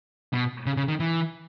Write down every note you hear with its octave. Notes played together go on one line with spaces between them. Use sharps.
B2
C#3
C#3
D#3
E3